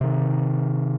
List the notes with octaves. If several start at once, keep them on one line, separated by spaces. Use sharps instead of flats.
C3 D#3